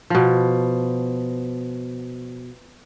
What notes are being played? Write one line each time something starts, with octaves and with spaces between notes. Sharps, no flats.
B2 F3